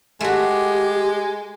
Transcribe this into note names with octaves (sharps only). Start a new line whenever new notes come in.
G#3 A3 F#4 G4